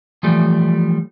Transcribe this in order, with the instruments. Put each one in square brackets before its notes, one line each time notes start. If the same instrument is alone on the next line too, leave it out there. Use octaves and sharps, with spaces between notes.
[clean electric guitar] E3 F3 G3 A3